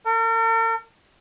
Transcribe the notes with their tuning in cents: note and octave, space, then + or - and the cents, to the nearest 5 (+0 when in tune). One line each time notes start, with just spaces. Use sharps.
A#4 -45